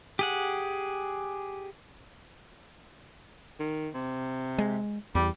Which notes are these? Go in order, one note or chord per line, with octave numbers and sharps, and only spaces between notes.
G4 G#4 F#5
D#3
C3
G#3
E2 G3